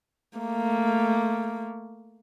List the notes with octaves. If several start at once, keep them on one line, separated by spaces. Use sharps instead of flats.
A3 A#3